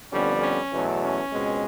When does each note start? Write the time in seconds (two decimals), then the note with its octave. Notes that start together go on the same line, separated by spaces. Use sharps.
0.10 F2 D3 G3 B3 C#4
0.41 C#4
0.72 E2 B2 F#3 A3
1.01 C#4
1.31 C#2 B2 G#3 C4